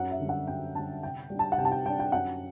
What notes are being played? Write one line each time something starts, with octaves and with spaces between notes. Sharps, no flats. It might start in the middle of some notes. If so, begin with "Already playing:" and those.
Already playing: F#2 F#5
E5
D3 G3
F#5
F#2 G5
D3 G3 A5
C3 G5
G3 D4
A5
F#5
C3 G5
A5
G5
G3 D4 G5
G5
F#2 F#5